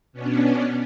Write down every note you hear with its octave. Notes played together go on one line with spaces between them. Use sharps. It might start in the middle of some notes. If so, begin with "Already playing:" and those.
B2 B3 C#4 D4